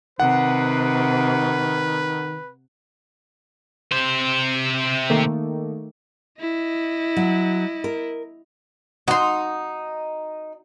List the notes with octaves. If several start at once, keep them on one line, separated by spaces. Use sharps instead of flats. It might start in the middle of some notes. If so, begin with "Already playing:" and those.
C3 D#3 B4 F#5
C3 C5
D#3 A3 A#3
E4 D#5
F#3
A#4
D#4 F#4 C6